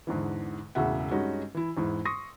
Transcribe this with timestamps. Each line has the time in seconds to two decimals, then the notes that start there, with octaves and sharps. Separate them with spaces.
0.07 E2 G#2 D3 E3
0.75 E1 A2 C#3 F#4 E5 F#5
1.11 G2 G#3 C#4 D#4 F#4
1.55 E3 E4
1.77 E2 G#2 E4
2.05 C6 C#6 D#6 A#6